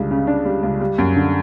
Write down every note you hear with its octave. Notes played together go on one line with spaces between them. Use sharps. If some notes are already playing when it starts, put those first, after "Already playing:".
Already playing: C#2 D3 G3
C#3
D4
G3
C#2
G3
F#2
D3